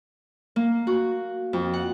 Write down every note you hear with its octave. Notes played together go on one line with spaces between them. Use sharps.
A#3
F#4
F2
F#5